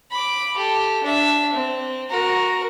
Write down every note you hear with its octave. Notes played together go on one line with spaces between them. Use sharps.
B5 D6
G4 A4
D4 E5
C4
F#4 A#4